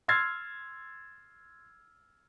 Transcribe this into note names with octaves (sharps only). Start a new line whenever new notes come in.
C6 E6 F6 G#6 A6 C7